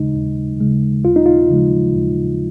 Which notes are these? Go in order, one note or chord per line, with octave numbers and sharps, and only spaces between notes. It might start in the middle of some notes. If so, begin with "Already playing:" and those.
Already playing: D#2 C#3 G#3 D#4
D#2
C#3 G#3
D#2 F4
D#4
F4
C#3 F3 G#3
D#2